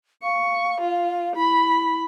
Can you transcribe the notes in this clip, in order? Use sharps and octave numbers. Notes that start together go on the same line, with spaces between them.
F5 C#6
F4
E4 B5